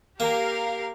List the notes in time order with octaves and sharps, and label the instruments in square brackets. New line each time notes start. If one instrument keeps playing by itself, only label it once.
[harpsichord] A#3 [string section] G4 A#4 F5